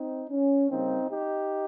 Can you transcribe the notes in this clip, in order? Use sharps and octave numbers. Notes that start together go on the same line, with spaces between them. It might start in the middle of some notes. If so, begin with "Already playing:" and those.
Already playing: C4 D#4
C#4
C#3 G3 A#3 C4 D#4
D#4 G4